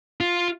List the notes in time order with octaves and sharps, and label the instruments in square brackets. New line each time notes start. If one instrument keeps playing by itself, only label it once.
[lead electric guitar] F4